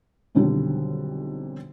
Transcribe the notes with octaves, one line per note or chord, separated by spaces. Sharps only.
B1 F2 D3 D#3 F#3 G3